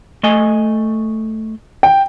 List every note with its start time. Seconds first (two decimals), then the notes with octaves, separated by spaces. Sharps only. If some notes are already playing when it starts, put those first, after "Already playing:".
0.23 A3 D#5 G#5
1.83 G5